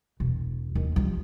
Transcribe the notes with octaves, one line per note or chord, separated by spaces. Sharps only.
E1
D#2
F3 G3